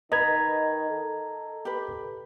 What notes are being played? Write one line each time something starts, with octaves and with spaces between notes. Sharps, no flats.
D#3 B4 D#5 A#5 G#6
A4
G4 B4